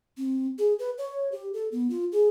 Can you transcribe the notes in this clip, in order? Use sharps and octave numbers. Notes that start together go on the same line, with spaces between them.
C4
G#4
B4
C#5
G4
A4
B3
F4
G#4